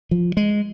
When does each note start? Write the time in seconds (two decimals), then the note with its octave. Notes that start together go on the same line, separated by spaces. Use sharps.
0.11 F3
0.37 G#3